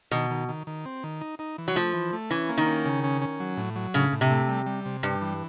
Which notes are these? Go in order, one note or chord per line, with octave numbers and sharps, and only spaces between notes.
B2 D#3
D#3
D#3
D#3
C4
D#3
D#4
D#4
E3
F#3
F3 A3
E3
A3
E3 C#4
A#3
D#3
C#4
C#3
C#4
C#4
F#3
A2
F#3
A2 C#3
A2
C3
A3
G3
G3
C3
G2 G3
E3